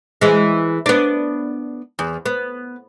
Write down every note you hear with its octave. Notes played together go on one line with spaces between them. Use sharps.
E3 G#3
B3 D4
E2
B3